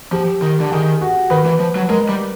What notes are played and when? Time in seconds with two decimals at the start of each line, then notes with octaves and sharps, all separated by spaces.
0.12 F3 G4
0.42 D#3
0.60 D3
0.72 D#3 G#4
1.01 F#4
1.31 D#3 B4
1.46 E3
1.60 F3
1.76 F#3
1.89 G#3 A#4
2.09 G3